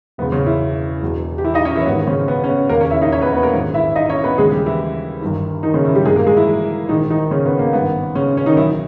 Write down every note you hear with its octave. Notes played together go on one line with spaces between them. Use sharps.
E1 E2 C#3 B3
C#3 C#4
E3 E4
E1 E2 B2
G4
E3 E4
D#4 D#5
C#4 C#5
E3 E4
C#4
G#1 G#2 D#3 B3
C#3 C#4
B3
C#4
B3
E1 D#2 C#3 A#3 A#4
C#4 C#5
E4 E5
D#4 D#5
C#4 C#5
B3 B4
B3 B4
A#3 A#4
A#1 G#2 D#3
E4 E5
D#4 D#5
C#4 C#5
B3 B4
D#2 C#3 E3 G#3 G#4
G3 G4
E3 E4
G1 G2 D#3
D#3 D#4
C#3 C#4
E3 E4
G3 G4
G1 G2 D#3 G#3 G#4
A#3 A#4
G#3 G#4
E3 E4
A#1 G#2 D#3 E3 D#4
D#3 D#4
C#3 C#4
B3
A#3
G#1 G2 D#3 B3
C#3 C#4
C#4
D#3 D#4
B1 B2 E3 E4